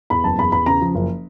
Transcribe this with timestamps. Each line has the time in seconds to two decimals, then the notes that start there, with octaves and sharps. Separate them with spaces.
0.10 E2 B5
0.24 F#1 A5
0.38 E2 B5
0.52 E2 B5
0.66 C#3 A#5
0.81 F3
0.95 F#1